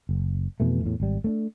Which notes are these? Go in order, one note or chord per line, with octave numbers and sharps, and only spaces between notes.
F#1
F2 B2 E3 A3
E2 A2
G#1 G3
A3 C#4 D4